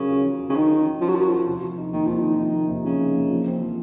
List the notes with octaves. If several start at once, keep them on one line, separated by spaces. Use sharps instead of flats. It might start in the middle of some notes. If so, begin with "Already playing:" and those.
Already playing: C#3 F#3 C#4 A#4
F4
F#3
C#4
C#3
D#3 A#4
F4
F#3
F3 C#4
F#3
F3 A#4
F#3
F3 F4
C3
F3
D#4
D#3 A#3
C3 F3
D#3 F3
D#4
A#3
C3
C#3 F3
D#4
A#3
F3
C4
F3